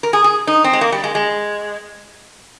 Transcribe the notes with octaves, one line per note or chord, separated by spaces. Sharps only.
A#4
G#4
G#4
D#4
C4
G#3
A#3
G3
G#3
G#3